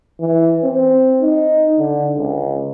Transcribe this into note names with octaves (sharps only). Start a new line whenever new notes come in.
E3
C4
D#4
D3
C#2